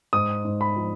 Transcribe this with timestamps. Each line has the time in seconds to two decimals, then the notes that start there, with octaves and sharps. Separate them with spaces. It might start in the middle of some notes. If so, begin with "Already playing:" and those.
0.13 G#2 D#6
0.45 G#2
0.61 B5
0.76 F3